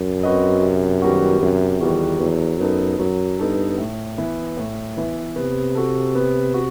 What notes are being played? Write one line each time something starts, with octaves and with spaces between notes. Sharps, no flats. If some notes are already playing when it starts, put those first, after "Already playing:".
Already playing: F#2
C4 F#4 B4 D#5
C3
D#3 G3 B3 F#4
F#2 C3
E2 D#3 G3 B3 F#4
E2 F#3
F#2 B3 D#4 A4
F#2 F#3
G2 B3 D#4 A4
A2
E3 B3 E4
A2
E3 B3 E4
C3 B3
F#4 A4
B3
F#4